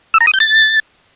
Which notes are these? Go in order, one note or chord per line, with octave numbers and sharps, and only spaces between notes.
E6
A#5
D#6
G6
A6